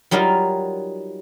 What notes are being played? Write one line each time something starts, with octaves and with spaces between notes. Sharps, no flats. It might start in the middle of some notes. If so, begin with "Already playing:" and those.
F#3 G3 D#4 F4 A#4